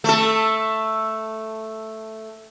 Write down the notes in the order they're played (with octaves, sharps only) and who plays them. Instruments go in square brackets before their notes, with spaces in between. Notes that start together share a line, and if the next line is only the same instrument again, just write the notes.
[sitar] A3 A4